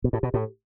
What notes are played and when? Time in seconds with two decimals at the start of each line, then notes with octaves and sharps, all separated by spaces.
0.04 B2
0.13 A2
0.23 B2
0.34 A2